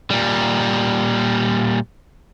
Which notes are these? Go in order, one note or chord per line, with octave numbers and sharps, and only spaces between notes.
A#2 G3